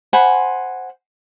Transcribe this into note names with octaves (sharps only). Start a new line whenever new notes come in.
C5 F#5 G#5 B5